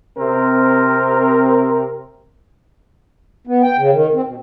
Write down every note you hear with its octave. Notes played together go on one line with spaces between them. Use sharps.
C3 C4 A#4
B3
G5
C#3
D#3
C4
B2